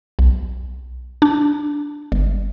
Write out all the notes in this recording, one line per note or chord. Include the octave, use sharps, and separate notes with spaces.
B1
D4
G1